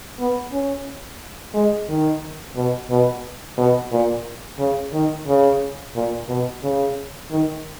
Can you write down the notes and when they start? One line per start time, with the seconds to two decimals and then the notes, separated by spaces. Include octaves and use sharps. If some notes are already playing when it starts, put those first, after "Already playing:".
0.19 B3
0.53 C#4
1.55 G#3
1.89 D#3
2.56 B2
2.90 B2
3.58 B2
3.92 A#2
4.59 C#3
4.93 D#3
5.27 C#3
5.95 A#2
6.29 B2
6.63 C#3
7.31 D#3